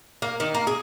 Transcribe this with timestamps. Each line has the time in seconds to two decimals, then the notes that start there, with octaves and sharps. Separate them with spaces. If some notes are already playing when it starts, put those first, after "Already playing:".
0.22 A#3
0.40 D#3
0.55 A#3
0.67 G#4